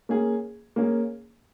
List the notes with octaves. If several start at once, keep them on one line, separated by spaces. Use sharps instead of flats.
A#3 C#4 G#4
A#3 C#4 G#4